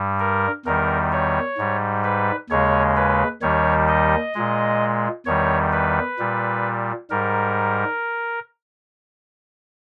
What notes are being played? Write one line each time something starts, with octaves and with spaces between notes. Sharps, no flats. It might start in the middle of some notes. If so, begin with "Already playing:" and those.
Already playing: G2 G3
A#4
E2 D#3 G3 A#4
C#5
G#2 G3
B4
D#2 C#3 G#3 C#5
B4
D#2 D#3 G3 C#5
D#5
A#2 G#3
E2 D#3 G3 C#5
B4
A#2 G3
G#2 G3 A#4